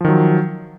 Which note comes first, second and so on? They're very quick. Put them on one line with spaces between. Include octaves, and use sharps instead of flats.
F3 D#3 F#3